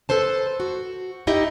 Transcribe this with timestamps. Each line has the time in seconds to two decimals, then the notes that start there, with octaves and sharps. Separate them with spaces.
0.09 A4 B4 C5 A5
0.60 F#4
1.27 D#4 E4 G4 D#5 E5